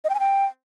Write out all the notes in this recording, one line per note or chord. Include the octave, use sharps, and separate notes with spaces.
D#5
G5
G#5
G5